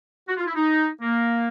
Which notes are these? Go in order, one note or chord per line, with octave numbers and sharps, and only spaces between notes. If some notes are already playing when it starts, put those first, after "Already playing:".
F#4
F4
E4
D#4
A#3